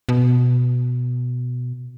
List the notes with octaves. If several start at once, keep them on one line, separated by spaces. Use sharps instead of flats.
B2